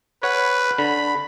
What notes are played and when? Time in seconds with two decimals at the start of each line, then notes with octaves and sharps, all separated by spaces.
0.23 B4 C#5 F#5
0.78 D3 B5